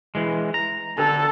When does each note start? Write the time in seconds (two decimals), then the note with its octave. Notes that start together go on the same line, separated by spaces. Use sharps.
0.15 E3 G#3
0.54 A#5
0.98 D3 A4